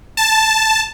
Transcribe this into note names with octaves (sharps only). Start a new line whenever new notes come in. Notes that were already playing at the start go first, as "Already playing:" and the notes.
A5